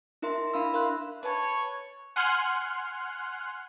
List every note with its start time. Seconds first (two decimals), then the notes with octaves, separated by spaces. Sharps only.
0.22 D#4 E4 A#4 E5 C6
0.54 D4 F5 B5 E6
0.73 A#4 E5 F5 C6 F#6
1.23 B4 C#5 A5
2.16 F#5 G#5 C6 F6 F#6